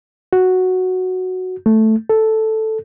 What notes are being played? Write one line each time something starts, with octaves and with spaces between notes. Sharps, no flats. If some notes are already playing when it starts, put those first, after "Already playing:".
F#4
A3
A4